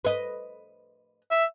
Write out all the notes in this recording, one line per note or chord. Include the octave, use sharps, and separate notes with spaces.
B4 D#5
E5